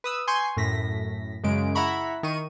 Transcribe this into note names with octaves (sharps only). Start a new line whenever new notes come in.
B4 D#6 E6
G#5 C6 C#6 G6
F#2 A2 A#6 B6
F#2 C#3 G#3 D7
E4 E5 F#5 A#5 B5 C#6
D#3 C#6 D#7